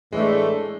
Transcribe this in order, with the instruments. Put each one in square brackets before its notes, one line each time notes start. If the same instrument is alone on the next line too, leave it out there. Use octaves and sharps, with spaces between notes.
[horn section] A2 E3 A3 D4 [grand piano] G#3